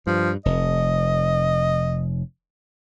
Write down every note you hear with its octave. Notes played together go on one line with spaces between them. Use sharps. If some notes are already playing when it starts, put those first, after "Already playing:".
G2 F3
F1 D#5